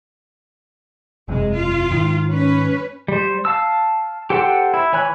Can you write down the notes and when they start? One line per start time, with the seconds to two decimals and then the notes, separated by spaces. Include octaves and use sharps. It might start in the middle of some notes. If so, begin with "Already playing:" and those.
1.28 F#1 E2 C3 G#3
1.57 F4
1.91 G#2 D#3
2.30 C#4 B4
3.08 G3 C5
3.45 F5 A5 E6
4.30 G4 A4 C5 F#5 G5
4.74 E4
4.93 E3 C#5 G#5 B5 F#6